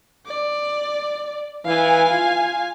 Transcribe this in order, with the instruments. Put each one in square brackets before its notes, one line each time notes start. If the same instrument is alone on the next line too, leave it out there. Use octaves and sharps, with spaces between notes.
[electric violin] D5
[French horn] E3 [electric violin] F5 G#5
[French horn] F4